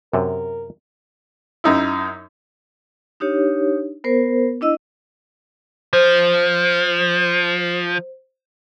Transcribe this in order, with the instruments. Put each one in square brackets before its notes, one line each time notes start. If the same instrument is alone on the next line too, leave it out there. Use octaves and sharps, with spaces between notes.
[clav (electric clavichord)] F#2 C3 [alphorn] A#4
[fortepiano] F#2 D#4 E4
[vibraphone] D4 D#4 G4 C#5
B3 A#4 C5
D4 E4 D#5 E6
[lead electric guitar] F3 [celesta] C5